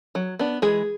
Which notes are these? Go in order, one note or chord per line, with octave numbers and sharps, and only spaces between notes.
F#3
B3 D4
E3 G#3 G#4